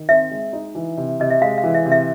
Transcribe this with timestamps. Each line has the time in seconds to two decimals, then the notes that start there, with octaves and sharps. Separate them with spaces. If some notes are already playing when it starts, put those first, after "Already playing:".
Already playing: D#3
0.09 C4 E5
0.31 G#3
0.53 D#4
0.75 E3
0.97 C3
1.20 C3 D#5
1.30 E5
1.41 G#3 F5
1.58 F5
1.63 E3
1.75 E5
1.85 C3
1.92 E5